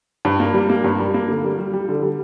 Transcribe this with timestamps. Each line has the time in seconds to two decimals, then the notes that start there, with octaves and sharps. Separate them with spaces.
0.25 G2
0.40 A#3
0.54 G3
0.70 A#3
0.84 G2
0.99 G3
1.14 A#3
1.28 D3
1.44 G3
1.59 G3
1.73 G3
1.88 D3
2.02 G3